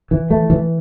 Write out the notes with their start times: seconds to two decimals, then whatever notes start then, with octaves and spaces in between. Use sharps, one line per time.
0.11 E3
0.30 A3
0.50 E3